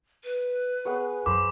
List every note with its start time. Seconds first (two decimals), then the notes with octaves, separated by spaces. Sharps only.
0.24 B4
0.85 B3 G#4 C#5
1.26 F#2 B4 C5 D6